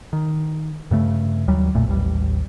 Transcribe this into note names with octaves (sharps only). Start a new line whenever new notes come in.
D#3
G2 C#3 A3
D#2 F#3 G3
B1 F2 A#2 A3
A1 D#2 G3